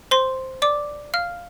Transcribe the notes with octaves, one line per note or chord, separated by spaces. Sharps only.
C5 C6
D5 D6
F5 F6